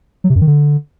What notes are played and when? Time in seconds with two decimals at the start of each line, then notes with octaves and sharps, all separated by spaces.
0.24 F#3
0.30 C3
0.36 F#2
0.41 D#3
0.47 D3